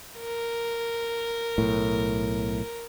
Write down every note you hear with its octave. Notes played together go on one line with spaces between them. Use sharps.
A#4
B1 A2